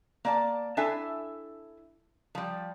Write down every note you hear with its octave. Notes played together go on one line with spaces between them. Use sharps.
A#3 D5 A5
D4 E4 A4 E5 G#5
F3 G3